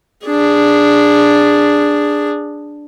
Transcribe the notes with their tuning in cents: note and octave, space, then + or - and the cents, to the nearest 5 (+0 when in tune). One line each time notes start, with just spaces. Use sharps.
D4 +0 G#4 -15